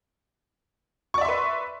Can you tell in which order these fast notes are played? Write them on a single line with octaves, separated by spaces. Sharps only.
C#6 D5 E5 C6 B4